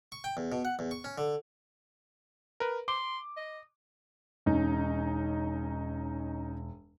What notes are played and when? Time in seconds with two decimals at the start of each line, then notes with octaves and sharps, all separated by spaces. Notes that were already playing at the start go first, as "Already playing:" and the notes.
0.12 C#6
0.24 G5
0.37 E2
0.52 B2
0.65 F#5
0.79 E2
0.91 C#6
1.04 C#4
1.18 D3
2.60 A#4 B4
2.88 C6 D6
3.37 D#5
4.46 E1 C#4 D#4